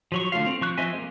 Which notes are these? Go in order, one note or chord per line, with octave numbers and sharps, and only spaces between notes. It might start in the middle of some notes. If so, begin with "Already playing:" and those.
F3 F#3 C#6
D3 A3 F4 F5
C4
F3 C#6 F#6
F3 C4 D#5 E5 G#5
G#3 A#3